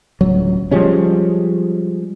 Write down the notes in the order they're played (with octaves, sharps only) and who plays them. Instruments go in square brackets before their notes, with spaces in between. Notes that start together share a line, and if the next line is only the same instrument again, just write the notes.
[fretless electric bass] D1 C#2 F#3
F3 G3 G#3 C#4